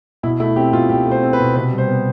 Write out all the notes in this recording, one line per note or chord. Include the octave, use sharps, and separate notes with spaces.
B2 E4
A3 E4
C4 G4
B2 F4
B2 G4
A3
C5
C4
B4
B2
C3 B4
G3
C5
B3